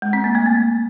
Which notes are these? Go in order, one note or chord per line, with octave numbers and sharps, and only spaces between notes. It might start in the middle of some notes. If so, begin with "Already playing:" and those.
G#3
C4
A#3
A3
A#3